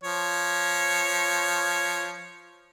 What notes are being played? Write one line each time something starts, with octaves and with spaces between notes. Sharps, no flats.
F3 C#5